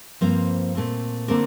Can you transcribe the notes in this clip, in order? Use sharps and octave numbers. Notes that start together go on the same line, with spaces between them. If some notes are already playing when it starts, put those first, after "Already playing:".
G2 F3 A#3 C4 C5
A#2 A3 C4
D3 A3 A#3 C4 A#4